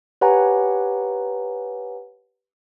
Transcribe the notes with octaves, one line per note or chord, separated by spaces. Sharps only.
G4 B4 C#5 F#5 G#5 A#5